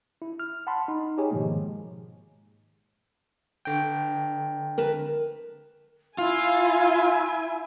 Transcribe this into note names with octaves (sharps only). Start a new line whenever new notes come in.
E4
F6
F#5 A5 B5 C6
D#4
D#4 G4 G#4 C#5 G#5
G#2 B2 D#3 F3 G#3 A#3
D3 G5
A#4 B4 A5
E4 F4 G#5